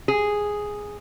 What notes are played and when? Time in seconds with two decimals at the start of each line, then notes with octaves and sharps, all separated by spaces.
0.08 G#4